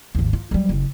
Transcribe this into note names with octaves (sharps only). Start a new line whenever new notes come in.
G#1 D#2
F4
F#3 G3
F#1 C4